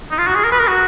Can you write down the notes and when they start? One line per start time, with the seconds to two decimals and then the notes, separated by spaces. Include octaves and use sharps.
0.11 D#4
0.18 F4
0.27 F#4
0.35 G#4
0.44 A#4
0.52 B4
0.59 A#4
0.67 F#4